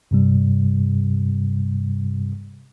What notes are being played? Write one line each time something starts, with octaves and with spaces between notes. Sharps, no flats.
G2 C3 G3